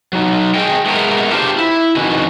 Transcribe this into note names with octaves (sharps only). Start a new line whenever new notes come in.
F#3 D#4
G#4 C5 D#5 G5
G#3 A3 B3 G4 A#4
D4 F4 G4 A#4 C5
E4
F2 D#3 C#4 F#4 B4